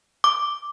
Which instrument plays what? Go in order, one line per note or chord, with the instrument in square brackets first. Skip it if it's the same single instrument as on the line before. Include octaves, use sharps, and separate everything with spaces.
[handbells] D6